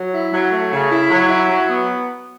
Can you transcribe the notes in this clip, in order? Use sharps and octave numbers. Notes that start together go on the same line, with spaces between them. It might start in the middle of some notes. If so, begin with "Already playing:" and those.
Already playing: F#3
E4
F#3
A3
C#3
E4
F#3
E4
F#3
B3